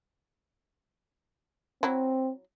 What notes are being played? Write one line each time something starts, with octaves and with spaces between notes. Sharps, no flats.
F#3 C4 E4